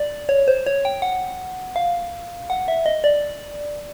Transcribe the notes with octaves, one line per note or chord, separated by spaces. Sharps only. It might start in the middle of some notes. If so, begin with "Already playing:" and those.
Already playing: D5
C#5
C5
C#5
G5
F#5
F5
F#5
E5
D#5
D5